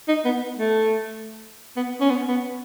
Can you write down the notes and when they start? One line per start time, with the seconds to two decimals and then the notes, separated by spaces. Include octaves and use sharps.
0.08 D#4
0.25 B3
0.58 A3
1.76 B3
2.01 C#4
2.10 B3
2.28 B3